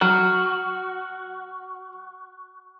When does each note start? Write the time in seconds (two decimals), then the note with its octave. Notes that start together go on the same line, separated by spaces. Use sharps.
0.01 F#3 F#4 F6